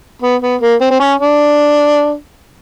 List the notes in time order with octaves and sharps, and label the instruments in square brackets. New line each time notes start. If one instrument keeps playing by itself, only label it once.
[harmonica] B3
B3
A#3
C4
C4
C#4
D4